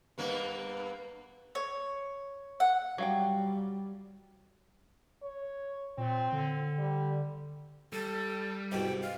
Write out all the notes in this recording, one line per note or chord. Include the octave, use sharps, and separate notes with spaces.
G2 A#3 B3
C#5
F#5
F#3 G3 F5 G5
C#5
A#2 C4
D3
G3
G3 A4
C2 G#2 B2 G5
F5